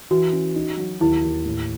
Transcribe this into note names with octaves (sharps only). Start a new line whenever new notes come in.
E3 F#4
C#4
D#4
F#3
D#2 E4
D#2
A2